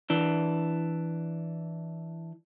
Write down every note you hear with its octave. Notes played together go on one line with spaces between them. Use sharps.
E3 D4